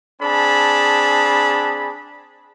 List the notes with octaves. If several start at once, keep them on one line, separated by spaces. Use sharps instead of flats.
C4 D4 G#4 A5 B5